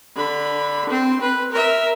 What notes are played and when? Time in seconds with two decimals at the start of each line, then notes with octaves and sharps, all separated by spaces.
0.16 D3 B5
0.90 C4 C6
1.21 B4
1.52 A#4 E5